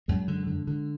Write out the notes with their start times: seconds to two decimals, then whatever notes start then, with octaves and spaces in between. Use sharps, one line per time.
0.08 F#2 G#3
0.28 D3
0.47 D3
0.67 D3